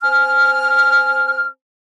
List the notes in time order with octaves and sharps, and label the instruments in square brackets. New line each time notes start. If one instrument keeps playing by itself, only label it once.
[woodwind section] C4 G#5 F6